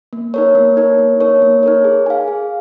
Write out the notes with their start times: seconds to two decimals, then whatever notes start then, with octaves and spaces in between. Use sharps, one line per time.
0.13 A#3
0.34 D#4 A#4 C#5
0.55 A#3
0.77 D#4 A#4 C#5
0.98 A#3
1.20 D#4 A#4 C#5
1.42 A#3
1.63 D#4 A#4 C#5
1.84 G#4
2.06 F5 G#5
2.28 G#4